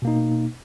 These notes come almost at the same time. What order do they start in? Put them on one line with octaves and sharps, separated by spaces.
B2 A#3 D#4